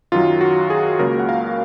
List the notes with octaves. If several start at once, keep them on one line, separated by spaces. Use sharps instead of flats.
F#2 D#3 F#3 F4
F#4
G#4
C#2 C#3 F#3 A#3 A#4
F#5
F5